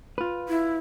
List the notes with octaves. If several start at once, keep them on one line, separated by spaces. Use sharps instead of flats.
F4 B4
E4